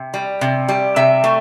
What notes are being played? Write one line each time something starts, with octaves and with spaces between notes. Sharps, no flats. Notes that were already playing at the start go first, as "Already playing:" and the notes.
Already playing: C3
G3
C3
G3
C3 E5
A3